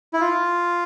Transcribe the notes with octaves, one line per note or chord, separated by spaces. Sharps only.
E4
F4